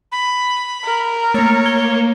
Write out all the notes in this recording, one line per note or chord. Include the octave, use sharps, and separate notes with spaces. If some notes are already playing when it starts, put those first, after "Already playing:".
B5
A#4
A3 A#3 C#5
A#3 G#6 G7